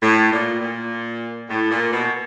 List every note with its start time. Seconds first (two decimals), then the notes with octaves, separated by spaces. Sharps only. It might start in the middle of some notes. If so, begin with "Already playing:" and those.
0.02 A2
0.31 A#2
0.60 A#2
1.49 A2
1.70 A#2
1.93 B2